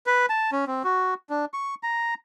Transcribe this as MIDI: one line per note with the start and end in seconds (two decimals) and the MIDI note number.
0.07 0.26 71
0.29 0.50 81
0.52 0.65 61
0.67 0.83 60
0.84 1.14 66
1.30 1.45 62
1.54 1.75 85
1.83 2.14 82